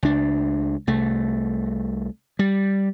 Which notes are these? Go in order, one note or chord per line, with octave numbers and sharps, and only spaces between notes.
C#2 D4
C2 A3
G3